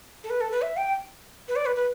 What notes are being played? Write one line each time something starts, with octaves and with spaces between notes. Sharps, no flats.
A4
B4
A4
B4
E5
G5
B4
D5
B4
B4